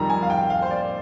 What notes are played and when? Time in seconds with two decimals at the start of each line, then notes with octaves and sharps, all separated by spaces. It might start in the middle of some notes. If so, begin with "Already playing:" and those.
Already playing: F2 D#3 G3 A#5
0.10 G#5
0.22 F5
0.30 G5
0.50 F5
0.62 C5
0.71 D5